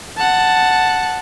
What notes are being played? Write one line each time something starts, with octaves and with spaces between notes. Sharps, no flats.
F#5 A5